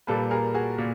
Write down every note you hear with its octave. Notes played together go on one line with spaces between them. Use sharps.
A#2 G3 A#3 A4 B4
G#4 A#4
F#4 G#4
A#2